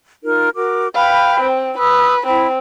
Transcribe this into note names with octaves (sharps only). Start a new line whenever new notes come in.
D#4 F4 A#4
F#4 A#4 D6
B4 F5 G5 B5
C4
B4 D#6 E6
C4 E4 B5